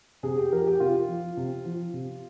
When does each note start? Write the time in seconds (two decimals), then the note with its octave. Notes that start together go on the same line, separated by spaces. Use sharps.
0.23 C3 G#4
0.37 G4
0.52 F3 A#4
0.67 G4
0.80 C3 F4
1.09 F3
1.37 C3
1.65 F3
1.93 C3